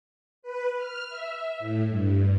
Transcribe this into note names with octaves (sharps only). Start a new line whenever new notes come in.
B4
F6
E5
A2
G2